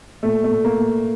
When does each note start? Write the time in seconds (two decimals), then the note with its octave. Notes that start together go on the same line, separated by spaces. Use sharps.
0.23 A#2 A3
0.44 A3
0.51 A#2
0.64 A#3
0.79 A#2